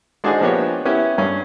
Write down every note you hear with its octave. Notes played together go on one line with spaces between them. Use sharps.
G#3 D4 D#4 F#4 G#4 C5
F3 A#3 B3 D4 G4 C#5
B3 C#4 E4 G4
G2 C#4